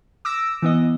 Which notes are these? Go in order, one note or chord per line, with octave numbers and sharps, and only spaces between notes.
D6 E6 A#6
E3 B3 D#5